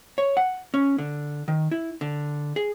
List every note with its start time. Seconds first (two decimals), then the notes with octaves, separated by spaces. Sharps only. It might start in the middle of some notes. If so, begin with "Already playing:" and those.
0.18 C#5
0.37 F#5
0.74 C#4
0.98 D3
1.48 D#3
1.71 E4
2.01 D3
2.56 G#4